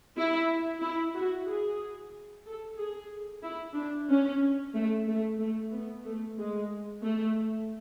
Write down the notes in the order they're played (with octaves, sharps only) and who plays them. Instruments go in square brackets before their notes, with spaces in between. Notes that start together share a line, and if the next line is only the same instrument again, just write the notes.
[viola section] E4
E4
F#4
G#4
A4
G#4
E4
D4
C#4
A3
A3
A3
B3
A3
G#3
A3